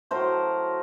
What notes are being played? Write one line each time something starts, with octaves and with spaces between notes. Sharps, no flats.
A2 F#3 A3 A#4 C5